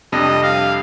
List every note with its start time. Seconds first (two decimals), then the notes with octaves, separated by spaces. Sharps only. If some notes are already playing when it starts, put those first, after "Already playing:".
0.12 F2 C3 G3 D4 D#5
0.43 F5